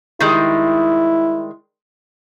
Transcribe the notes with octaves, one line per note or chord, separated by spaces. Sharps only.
D#3 G3 G#3 E4